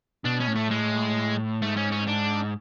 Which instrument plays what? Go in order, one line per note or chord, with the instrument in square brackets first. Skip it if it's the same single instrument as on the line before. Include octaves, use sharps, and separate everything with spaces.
[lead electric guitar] B2 [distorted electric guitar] D4
[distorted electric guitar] C#4
[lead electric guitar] A2
[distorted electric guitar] A3
G#3
[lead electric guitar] G#2 [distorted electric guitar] A3
[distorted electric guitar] C#4
C#4
D4